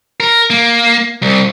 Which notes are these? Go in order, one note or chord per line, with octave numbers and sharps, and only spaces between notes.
A#4
A#3
C2